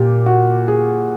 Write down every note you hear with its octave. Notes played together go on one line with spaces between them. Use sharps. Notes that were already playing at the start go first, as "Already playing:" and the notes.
Already playing: A#2 G4
F#4
G#4